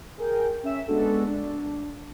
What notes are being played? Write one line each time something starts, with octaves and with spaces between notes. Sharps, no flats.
G#4 A#4 G5
C#4 E5 E7
G#3 B3 D4 F#4 A4
D4